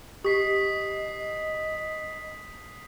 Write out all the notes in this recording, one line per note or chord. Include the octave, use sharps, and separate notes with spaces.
G4 D#5 D#6 B6 C7